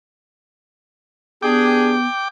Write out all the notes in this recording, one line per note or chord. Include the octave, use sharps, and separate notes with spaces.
B3 D4 G4 G#4 G5 D6